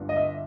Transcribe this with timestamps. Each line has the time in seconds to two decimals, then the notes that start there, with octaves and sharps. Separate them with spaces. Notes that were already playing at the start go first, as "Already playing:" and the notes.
Already playing: G1 G2 B3
0.09 D#5
0.16 E5